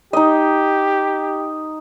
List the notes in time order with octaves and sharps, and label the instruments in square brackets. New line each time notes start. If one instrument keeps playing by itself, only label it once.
[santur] D#4 D#5 [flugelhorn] G4